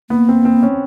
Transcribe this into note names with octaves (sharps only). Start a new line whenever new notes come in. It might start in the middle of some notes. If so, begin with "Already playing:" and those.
A#3 B3
C4
C4
C#4